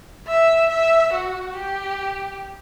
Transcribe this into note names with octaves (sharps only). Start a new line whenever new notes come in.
E5
E5
F#4
G4